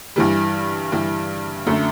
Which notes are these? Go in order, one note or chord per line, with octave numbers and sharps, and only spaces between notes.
G2 E3 G3
G2 E3 G3
F#2 D3 A3